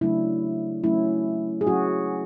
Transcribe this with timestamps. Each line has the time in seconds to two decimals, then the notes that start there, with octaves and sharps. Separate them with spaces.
0.01 C#3 F#3 A3 D4 E4
0.84 F#3 A3 C#4 E4
1.61 G#4
1.67 F#3 C#4 F#4